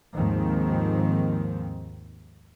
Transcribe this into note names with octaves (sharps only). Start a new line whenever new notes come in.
D#2 G#2 D#3 F3 C4